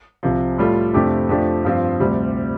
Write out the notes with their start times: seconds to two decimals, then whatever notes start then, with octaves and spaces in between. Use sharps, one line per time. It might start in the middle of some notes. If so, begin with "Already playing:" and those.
0.23 C2 C3 F3
0.58 A2 G3 F4 A4
0.94 F2 C3 A3 D4 G4
1.29 F2 F3 A3 D4 G4
1.65 G2 F3 C4 F4
2.00 D2 C3 G3